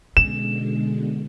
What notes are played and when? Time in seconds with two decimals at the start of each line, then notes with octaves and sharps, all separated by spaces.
0.17 B2 D3 G#3 C#4 E7